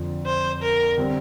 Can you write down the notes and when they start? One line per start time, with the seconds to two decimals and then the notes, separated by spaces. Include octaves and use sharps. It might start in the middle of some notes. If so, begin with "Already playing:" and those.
Already playing: F2 D3 F3
0.26 C5
0.62 A#4
0.98 D3 G3 C4